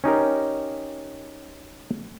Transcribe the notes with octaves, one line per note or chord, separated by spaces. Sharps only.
C#4 D#4 G4 A#4